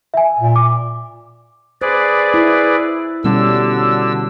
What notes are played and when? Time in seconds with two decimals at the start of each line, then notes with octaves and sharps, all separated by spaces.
0.14 E5 G#5
0.39 A#2
0.56 D6
1.82 G#4 B4 C5 D5
2.34 E4
3.24 B2 D3 G3 C#4 E6